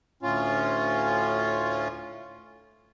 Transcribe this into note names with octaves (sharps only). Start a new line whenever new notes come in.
D2 A2 C#4 F4